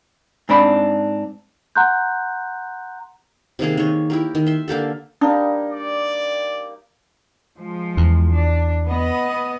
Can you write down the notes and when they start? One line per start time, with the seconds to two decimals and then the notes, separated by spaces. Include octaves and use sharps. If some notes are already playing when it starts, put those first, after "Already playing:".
0.49 G#2 C4 D4 B5
1.75 F#5 A#5 C6 F#6 G6
3.59 C3 D#3 A#3 G#4
3.77 D#3 C#5
4.10 E4 G4 A#4
4.35 D#3
4.46 E5 C6
4.68 D3 A#3 G4 A4
5.21 G3 A#3 D4 D#4
5.72 D5
7.57 F3 G#3
7.97 E2
8.34 D4
8.87 B3 D#5